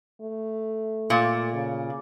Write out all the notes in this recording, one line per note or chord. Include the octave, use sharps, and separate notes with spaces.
A3
A#2
C#3